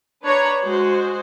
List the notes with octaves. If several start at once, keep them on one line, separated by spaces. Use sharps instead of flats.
D4 B4 C#5 A#5
G#3 F#4 C5